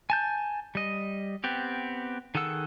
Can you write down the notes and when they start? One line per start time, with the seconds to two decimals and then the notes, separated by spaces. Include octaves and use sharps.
0.10 G#5 A5 G6
0.75 G3 D#5
1.44 B3 C4 G4
2.35 D#3 G#4 A4 F#5 E6